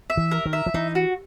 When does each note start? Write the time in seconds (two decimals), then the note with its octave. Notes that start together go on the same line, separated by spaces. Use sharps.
0.10 E5
0.17 E3
0.31 A#4
0.46 D#3
0.53 E5
0.66 F3
0.74 E3 D#4
0.95 F#4